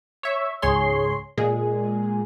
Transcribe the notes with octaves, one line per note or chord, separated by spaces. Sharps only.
C#5 E5
C#2 G#2 G#4 C#5 C6
A#2 G#3 G#4